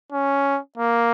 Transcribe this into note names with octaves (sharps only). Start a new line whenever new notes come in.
C#4
A#3